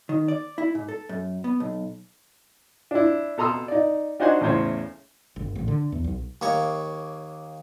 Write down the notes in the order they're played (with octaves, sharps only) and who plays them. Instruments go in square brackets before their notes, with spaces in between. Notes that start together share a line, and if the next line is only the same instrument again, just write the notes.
[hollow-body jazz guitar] D#3
D5
E4
G#2
A4
F#2
B3
B1
[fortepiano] D4 E4
B2 A4 A#5 C6 D#6 E6
D#4 D5
D4 D#4 F#4 C5 F#5 G#5
E2 A2 C#3 C5 C#5
[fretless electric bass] G1
A1
D3
E2
B1
[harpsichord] D#2 A#3 C#5 C#6